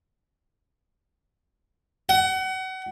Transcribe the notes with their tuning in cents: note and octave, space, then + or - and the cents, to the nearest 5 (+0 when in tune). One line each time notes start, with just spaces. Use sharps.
F#5 +30